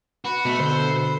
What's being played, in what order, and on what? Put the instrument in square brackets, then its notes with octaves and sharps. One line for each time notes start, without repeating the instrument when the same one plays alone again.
[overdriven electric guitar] F#4 [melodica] B4
[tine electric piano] B2 [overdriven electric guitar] A3
[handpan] D3 A4 [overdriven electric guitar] C5